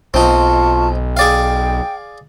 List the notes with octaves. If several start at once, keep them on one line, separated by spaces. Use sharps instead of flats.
B1 C4 D#4 F4 A5 C#6
G#4 D5 F5 G5